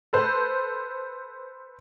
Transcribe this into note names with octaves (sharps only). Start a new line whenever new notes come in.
A4 B4 C5